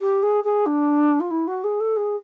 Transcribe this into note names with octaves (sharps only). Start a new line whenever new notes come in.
G4
G#4
G#4
D4
F4
E4
F#4
G#4
A4
G#4